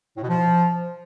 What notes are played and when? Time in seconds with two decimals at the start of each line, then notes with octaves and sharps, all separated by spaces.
0.17 A2
0.23 B2
0.28 F3